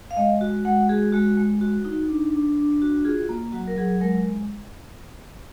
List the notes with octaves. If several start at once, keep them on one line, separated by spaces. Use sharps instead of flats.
F5
G#3 D#5
F#4
G#3 F#5
F#4 G#4
G#3 F#4
G#3
F#4
D#4
D4
D4
D4
F#4
F4 G#4
A#3
F#3 F#4
A#4
F#3 G#4
G#3 A#4